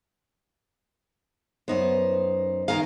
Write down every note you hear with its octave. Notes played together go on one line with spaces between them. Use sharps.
F#2 B3 D#4 C5
D#3 B3 G#4 F5 A#5